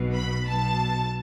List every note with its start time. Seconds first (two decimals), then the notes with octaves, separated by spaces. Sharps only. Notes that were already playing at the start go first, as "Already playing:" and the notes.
Already playing: B1 B2
0.14 B5
0.48 B1 B2 A5